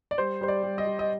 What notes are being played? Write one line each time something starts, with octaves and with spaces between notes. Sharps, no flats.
D5
G3 C5
G3 C5
D5
G3
D#5
G3
D#5